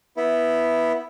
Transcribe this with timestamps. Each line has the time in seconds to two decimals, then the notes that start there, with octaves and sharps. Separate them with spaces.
0.17 B3 E4